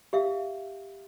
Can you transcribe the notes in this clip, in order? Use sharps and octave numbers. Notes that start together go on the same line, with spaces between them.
G4 E5 F5